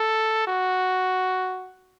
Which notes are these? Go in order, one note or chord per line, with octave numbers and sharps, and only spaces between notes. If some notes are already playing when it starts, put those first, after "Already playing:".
Already playing: A4
F#4